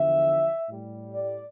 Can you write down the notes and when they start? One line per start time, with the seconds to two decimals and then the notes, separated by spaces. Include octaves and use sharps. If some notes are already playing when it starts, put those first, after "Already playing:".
Already playing: E2 D3 F3 E5
0.69 A2 G3
1.14 D5